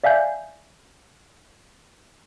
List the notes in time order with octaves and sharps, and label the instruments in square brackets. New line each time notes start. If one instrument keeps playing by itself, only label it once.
[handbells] D5 E5 F5 G#5 G6